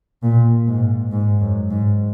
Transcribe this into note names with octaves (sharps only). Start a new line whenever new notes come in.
A#2
G#2
G#2
F#2
G#2